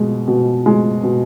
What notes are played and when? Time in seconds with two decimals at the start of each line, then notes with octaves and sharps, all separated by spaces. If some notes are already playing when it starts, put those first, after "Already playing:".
Already playing: B2 G#3
0.28 B2
0.66 G#3
1.04 B2